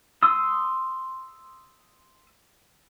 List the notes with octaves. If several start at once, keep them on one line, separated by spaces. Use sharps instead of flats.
C6 D#6 E6